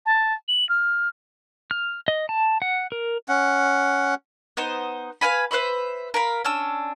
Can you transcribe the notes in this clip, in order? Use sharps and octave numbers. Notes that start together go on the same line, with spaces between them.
A5
F#7
F6
F6
D#5
A5
F#5
A#4
C#4 F#5
B3 D#4 C5
B4 F5 G#5 B5
B4 C5 E5 B5
A#4 F5 B5
C#4 D4 E6